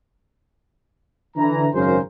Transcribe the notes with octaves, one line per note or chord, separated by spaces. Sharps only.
D3 E3 A#5
G#1 F#2 C#3 G#4 A#4 C5